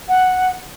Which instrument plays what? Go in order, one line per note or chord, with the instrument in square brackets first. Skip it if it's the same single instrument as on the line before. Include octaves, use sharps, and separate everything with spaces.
[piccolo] F#5